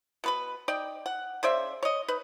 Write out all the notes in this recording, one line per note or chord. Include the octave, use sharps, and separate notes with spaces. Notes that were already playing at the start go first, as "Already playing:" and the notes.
B2 B4 B5
D#4 D5 G5
F#5
C#3 C5 D5 E5
C#5 D#5
D#4 B4